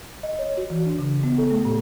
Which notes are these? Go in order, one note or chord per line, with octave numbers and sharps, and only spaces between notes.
D#5
C#5
F#4
E3
D4
C#3
B3
A4
A3
A2